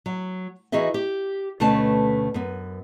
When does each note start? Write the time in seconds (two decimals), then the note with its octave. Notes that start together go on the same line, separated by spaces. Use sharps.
0.06 F#3
0.72 E3 D#4 F#4 G#4 D#5 E5
0.94 G4
1.60 D2 B2 A3 C#4 B4 A5
2.34 F#2 B3